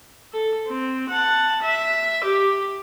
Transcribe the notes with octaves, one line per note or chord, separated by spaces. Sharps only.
A4
C4
F#5 A5
E5
G4